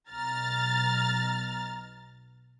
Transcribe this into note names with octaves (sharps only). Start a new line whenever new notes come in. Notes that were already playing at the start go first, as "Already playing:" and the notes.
B1 A#5 F6 A6